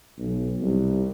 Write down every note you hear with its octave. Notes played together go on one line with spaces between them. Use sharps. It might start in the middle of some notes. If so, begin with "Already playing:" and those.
B1
C2